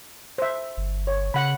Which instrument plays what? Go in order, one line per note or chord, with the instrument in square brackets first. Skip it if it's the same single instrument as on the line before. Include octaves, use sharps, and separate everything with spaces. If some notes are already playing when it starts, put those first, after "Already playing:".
[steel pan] C5 E5
[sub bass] G1
[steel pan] C#5
[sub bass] C#3 [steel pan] F#5 B5